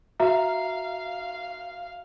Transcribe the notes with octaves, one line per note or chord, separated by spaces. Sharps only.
F#4 E5 F5 A#5